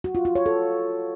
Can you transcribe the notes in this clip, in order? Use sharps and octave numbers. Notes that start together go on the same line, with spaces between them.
F#4
F4
F4
C#5
A4